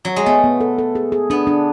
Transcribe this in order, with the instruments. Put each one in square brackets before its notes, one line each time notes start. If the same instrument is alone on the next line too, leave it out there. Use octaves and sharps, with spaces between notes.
[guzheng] F#3
G#3
[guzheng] A3 [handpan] B3
[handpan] B3
A4
A4
G#4
G#4
[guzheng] B3 [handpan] D4
[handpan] D4